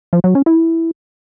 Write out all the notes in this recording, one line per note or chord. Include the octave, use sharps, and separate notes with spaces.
F3
F#3
C#4
E4